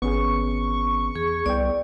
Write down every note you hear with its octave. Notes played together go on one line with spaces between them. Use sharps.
G#1 B3 C#4 G#4 C#6
E2 G#4
C2 B3 D5 G5